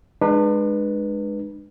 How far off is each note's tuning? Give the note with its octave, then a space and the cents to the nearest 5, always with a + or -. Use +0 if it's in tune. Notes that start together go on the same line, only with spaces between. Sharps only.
G#3 +0 D4 +40 B4 -15